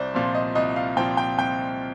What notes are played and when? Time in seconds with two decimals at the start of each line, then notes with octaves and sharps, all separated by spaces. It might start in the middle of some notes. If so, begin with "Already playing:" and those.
Already playing: C2 C5 D5
0.14 A#2 F3 C4
0.34 D#5
0.55 C2 D#5
0.76 F5
0.97 A#2 F3 C4 G5
1.17 G5
1.38 C2 G5